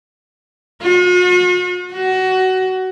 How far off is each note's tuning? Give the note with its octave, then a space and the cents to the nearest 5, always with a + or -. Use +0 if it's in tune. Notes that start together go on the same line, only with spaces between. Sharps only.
F#4 -45
F#4 +20